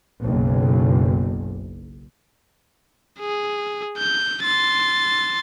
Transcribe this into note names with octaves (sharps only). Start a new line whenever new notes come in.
F#1 B1
G#4
G6
C6 A6